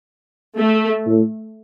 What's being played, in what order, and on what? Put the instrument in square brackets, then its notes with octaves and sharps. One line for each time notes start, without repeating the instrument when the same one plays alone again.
[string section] A3
[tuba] A2